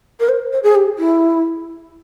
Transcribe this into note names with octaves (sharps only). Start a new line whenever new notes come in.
A#4
C5
C5
G#4
G4
E4